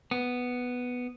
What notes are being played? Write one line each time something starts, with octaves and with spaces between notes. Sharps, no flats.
B3